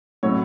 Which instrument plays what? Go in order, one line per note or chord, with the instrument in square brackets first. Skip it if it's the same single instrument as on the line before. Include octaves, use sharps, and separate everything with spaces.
[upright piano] A2 F#3 C#5